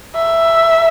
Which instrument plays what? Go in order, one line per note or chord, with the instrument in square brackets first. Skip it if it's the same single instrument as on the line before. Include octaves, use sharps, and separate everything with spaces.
[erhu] E5